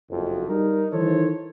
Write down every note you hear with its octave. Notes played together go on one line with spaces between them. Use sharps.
F#1 F2
G3 D#4 A#4
D#3 E3 D#4 A4 C5 C#5